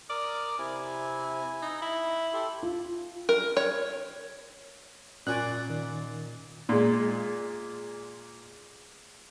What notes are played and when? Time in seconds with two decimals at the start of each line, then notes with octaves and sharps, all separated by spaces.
0.10 A#4 D5 D#6 F6
0.59 C3 E4 G#5
1.62 D#4
1.82 E4
2.33 G4 A4 C6
2.63 F4
3.29 A#4
3.57 C#5
5.27 A#2 C#4 D5 G#5 F#6
5.70 D#3
6.69 A#2 G#3